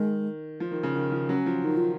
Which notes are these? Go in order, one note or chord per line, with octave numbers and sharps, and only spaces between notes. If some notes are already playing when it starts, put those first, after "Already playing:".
Already playing: D#3 G#3
F3
D#3
C#3
D#3
F3
F#3 C#4
F3
D#3 D#4
F4